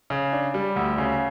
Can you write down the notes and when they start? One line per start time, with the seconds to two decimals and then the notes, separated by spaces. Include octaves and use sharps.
0.10 C#3
0.33 D4
0.54 G3
0.76 D2
0.98 C#3